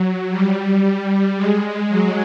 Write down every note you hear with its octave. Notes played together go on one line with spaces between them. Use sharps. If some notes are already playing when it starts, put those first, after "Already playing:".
Already playing: F#3
G3
G#3
F#3